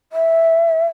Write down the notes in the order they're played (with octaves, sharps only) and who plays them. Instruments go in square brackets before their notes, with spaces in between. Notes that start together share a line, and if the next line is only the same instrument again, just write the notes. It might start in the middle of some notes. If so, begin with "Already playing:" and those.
[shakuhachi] E5